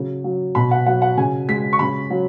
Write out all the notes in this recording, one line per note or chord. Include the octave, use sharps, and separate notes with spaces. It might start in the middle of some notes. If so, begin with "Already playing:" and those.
Already playing: C#3 F#3
F#3
B2 B5
F#5
F#3 F#5
F#5
C#3 G#5
G#3 B6
C#6
C#3 B5
F#3